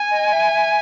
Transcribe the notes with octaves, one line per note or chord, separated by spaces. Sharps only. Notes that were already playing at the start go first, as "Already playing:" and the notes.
Already playing: G#5
D#5
E5
E5